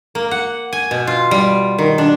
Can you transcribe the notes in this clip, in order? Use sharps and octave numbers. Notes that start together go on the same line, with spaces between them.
A#3
F#5
G#5
B2
F4
G3
D#3
D4